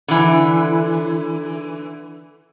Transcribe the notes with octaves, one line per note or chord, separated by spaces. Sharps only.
D3 E3